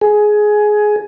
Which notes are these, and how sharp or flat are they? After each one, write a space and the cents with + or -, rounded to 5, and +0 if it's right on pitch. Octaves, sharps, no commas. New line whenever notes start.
G#4 +15